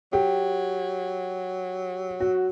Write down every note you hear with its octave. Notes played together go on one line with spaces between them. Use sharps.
F#3 G4
F#4